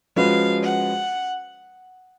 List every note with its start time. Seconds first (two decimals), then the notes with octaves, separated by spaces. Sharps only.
0.16 F3 G#3 C#4 F#4 B4 F5
0.62 F#5